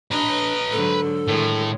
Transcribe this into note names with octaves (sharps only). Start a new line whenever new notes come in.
D4 B4 D#5 A#5
G#2 D3 F#3 A4
A2 D#3 G#3